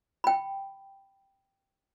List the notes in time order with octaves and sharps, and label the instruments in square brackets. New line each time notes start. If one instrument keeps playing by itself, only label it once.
[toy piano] G5 B5